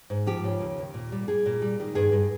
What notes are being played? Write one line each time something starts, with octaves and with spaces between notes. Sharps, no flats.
G#2
F3 G4
C#3
D#2
D#2
A#2
G3
G3 G#4
A#2
G3
D#3
G2 G#4
G2